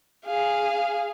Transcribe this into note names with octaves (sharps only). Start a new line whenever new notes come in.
G#4 F5